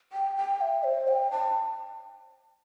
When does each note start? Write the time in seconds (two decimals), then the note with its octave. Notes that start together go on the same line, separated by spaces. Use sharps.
0.13 G5
0.37 G5
0.61 E5
0.84 C5
1.08 G5
1.31 A5